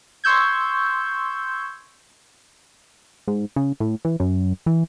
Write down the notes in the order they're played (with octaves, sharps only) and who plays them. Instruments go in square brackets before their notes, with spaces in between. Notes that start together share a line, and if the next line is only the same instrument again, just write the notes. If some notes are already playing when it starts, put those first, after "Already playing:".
[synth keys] C6 C#6 E6 G6 G#6
[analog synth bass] G#2
C#3
A2
E3
F#2
E3